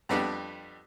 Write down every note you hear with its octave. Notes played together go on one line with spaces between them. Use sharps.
F2 G3 B3 D4